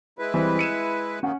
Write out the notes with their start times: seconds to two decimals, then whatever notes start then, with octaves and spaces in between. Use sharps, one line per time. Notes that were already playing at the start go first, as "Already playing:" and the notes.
0.19 G#3 E4 B4
0.34 E3 G3 C4
0.59 C#7 D#7 E7
1.23 D#3 A#3 C#4 F#5